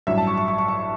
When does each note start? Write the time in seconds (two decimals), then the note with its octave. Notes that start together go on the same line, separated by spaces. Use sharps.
0.07 A1 G2 F#3 E5
0.18 A5
0.27 C#6
0.38 C#6
0.48 C#6
0.58 C#6
0.68 C#6